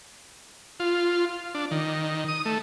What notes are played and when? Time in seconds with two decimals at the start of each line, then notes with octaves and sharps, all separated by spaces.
0.80 F4
1.55 D4
1.71 D#3
2.28 D#6
2.45 A3